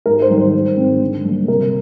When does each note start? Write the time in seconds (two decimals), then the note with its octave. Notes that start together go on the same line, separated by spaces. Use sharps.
0.06 G#2 A#4
0.22 C5
0.30 D#3 G3
0.38 C5
0.54 G#2
0.77 D#3 G#3 C4
1.01 D3
1.25 G3 A#3
1.48 C3 A#4